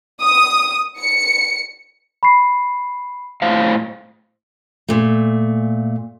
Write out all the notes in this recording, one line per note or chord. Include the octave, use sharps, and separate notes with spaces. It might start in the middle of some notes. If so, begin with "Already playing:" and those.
D#6
C#7
B5 C#6 C7
A2 C5 F5
A#2 A3